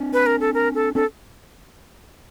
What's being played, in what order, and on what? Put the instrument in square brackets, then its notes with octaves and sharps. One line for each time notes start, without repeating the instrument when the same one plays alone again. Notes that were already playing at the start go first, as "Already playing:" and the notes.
Already playing: [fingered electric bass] C4 D4
[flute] B4
A#4
A4
A#4
A4
[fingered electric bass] C4 D4 [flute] A4